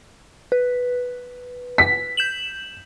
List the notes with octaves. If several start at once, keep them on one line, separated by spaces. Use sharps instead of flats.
B4
B6
G6 E7 F#7